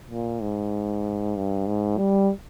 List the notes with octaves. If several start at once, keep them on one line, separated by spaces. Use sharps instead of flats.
A#2
G#2
G2
G#2
G3